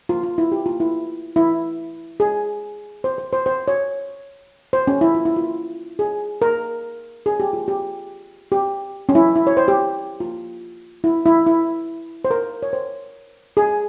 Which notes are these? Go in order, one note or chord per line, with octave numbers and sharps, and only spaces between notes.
F4
F4
E4
G4
F4
E4
E4
G#4
C5
C5
C5
C5
C#5
C5
C#4
E4
F4
E4
F4
G#4
A#4
G#4
G4
F4
G4
G4
C#4
E4
E4
C#5
C5
G4
F4
E4
E4
E4
C5
A#4
C#5
C5
G#4